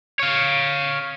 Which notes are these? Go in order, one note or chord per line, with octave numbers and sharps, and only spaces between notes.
C#5 F5